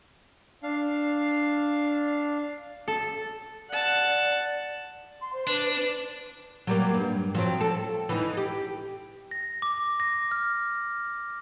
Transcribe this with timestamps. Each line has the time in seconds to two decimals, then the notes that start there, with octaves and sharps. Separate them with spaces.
0.63 D4 F5
2.88 A4
3.70 D5 F#5 A5
5.21 C6
5.33 C5
5.47 D4 B4
5.70 B4
6.67 F#3 G3 A#3
6.94 G2
7.35 F3 F#3 C4
7.61 A4
8.09 E3 D#4
8.37 G4
9.31 A#6
9.62 D6
10.00 A#6
10.31 F6